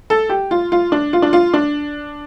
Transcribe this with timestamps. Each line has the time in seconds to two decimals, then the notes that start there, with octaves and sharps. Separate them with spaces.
0.10 A4
0.29 G4
0.51 F4
0.72 F4
0.92 D4
1.13 F4
1.22 D4
1.33 F4
1.54 D4